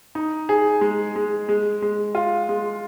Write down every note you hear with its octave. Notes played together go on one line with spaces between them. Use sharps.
D#4
G#4
G#3
G#3
G#3
G#3
F4
G#3